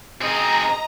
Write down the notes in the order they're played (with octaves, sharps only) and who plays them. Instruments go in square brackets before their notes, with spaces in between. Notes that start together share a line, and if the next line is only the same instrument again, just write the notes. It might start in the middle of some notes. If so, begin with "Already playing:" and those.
[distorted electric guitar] C4 G#4 [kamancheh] D#5 [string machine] A#5